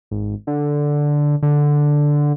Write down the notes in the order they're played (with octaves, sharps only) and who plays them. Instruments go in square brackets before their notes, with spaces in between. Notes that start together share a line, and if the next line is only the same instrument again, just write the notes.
[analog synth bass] G#1
D3
D3